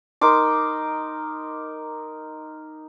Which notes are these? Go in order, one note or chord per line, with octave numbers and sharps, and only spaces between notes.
D#4 A#4 C6 D6